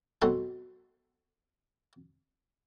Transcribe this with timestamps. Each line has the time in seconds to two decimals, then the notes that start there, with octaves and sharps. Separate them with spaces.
0.22 B2 F#3 C4 A4 B4 C6